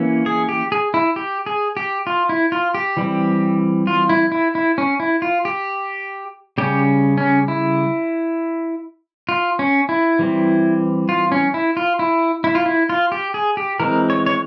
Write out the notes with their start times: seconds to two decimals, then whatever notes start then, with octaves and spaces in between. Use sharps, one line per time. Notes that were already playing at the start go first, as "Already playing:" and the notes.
Already playing: E3 A#3 C#4
0.26 G#4
0.49 G4
0.72 G#4
0.94 E4
1.16 G4
1.46 G#4
1.77 G4
2.07 F4
2.29 E4
2.52 F4
2.75 G4
2.97 E3 G3 C4
3.87 F4
4.09 E4
4.32 E4
4.55 E4
4.78 C#4
5.00 E4
5.22 F4
5.45 G4
6.58 C#3 G3 C#4 G4
7.18 C#4
7.48 E4
9.29 F4
9.59 C#4
9.89 E4
10.19 E3 G3 C4
11.09 F4
11.32 C#4
11.54 E4
11.77 F4
11.99 E4
12.44 E4
12.55 F4
12.66 E4
12.90 F4
13.12 G4
13.34 G#4
13.57 G4
13.80 E3 G#3 C4 A#4
14.10 C#5
14.26 C#5